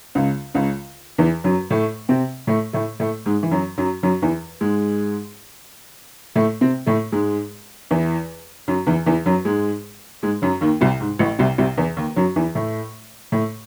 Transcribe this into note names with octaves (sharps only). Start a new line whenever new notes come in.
C#2 C#3
C#2 C#3
E2 E3
F#2 F#3
A2 A3
C3 C4
A2 A3
A2 A3
A2 A3
G#2 G#3
E3
F#2 F#3
F#2 F#3
F#2 F#3
E2 E3
G#2 G#3
A2 A3
C3 C4
A2 A3
G#2 G#3
E2 E3
F#2 F#3
E2 E3
E2 E3
F#2 F#3
G#2 G#3
G#2 G#3
F#2 F#3
D#2 D#3
C2 C3
G#2
A1 A2
C2 C3
C2 C3
E2 E3
D#2 D#3
F#2 F#3
E2 E3
A2 A3
A2 A3